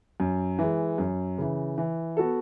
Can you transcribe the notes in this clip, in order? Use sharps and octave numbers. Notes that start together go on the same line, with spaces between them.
F#2
E3 G#3
F#2
C#3 E3
E3
B3 F#4 A4